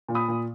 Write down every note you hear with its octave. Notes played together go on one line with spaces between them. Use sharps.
A#2
B5 D#6
A#2